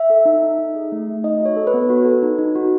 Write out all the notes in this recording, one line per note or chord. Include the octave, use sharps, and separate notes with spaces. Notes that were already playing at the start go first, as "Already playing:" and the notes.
Already playing: E5
A4
D#4
D#4
D#4
G#4
A3
A3
D#4 D#5
F#4
C#5
A4
B4
B3
F#4
A4
D#4
D#4
F#4